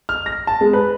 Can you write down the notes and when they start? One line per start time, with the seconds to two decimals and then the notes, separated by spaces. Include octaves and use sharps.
0.09 F6
0.26 A#6
0.47 A5
0.61 G#3
0.73 B4